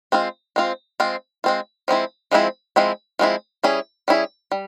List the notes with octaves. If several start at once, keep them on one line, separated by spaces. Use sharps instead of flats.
G#3 C4 F4
G#3 C4 F4
G#3 C4 F4
G#3 C4 F4
F3 G#3 C4 E4
F3 G#3 C4 E4
F3 G#3 C4 E4
F3 G#3 C4 E4
G3 C#4 E4 G#4
G3 C#4 E4 G#4
G3